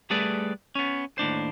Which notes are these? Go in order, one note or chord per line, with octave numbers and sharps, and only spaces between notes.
G3 A3 G#4 B4 D5
B3 C#4
D#2 A2 D4 C5